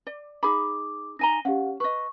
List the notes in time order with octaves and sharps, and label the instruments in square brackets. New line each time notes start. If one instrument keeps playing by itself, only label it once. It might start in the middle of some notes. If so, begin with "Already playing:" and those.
[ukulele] D5
[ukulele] D#4 G#4 B5 [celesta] D6
[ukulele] D#4 G#5 A#5 [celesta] A#6 D#7 G7
[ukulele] C#4 [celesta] G4 F5 F#5
[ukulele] B4 D#5 [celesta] C#6